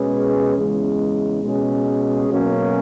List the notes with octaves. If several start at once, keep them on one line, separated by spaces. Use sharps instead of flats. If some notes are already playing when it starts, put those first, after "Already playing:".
Already playing: B2 G#3 C#4 G#4 B4
E2 C#3 G#3
B2 G#3 C#4 G#4
B2 F#3 A#3 C#4